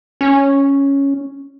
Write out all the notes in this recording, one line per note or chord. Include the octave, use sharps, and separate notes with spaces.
C#4